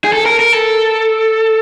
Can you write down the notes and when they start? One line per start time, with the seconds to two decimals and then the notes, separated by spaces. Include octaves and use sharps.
0.04 G#4
0.13 A4
0.26 A#4
0.39 A#4
0.52 A4